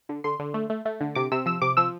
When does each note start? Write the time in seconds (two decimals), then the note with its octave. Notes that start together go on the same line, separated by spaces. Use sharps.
0.09 D3
0.24 D3 C6
0.39 D3
0.54 A3
0.70 A3
0.85 A3
1.01 D3
1.15 C3 D6
1.32 C3 E6
1.46 F3 E6
1.62 C3 D6
1.77 F3 E6